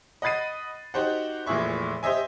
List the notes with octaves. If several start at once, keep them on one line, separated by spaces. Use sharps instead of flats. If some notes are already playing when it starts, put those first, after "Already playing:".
D#5 F#5 B5 A6 C7 D#7
D#4 F#4 G4 C5 F#5
F1 A#2 E3 G#4 E5 C#6
G4 C5 D#5 E5 G#5